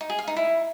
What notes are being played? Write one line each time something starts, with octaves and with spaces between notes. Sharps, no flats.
D#4
G#4
F5
D#4
E4